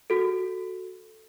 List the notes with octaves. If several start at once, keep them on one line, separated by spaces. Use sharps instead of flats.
F#4 A4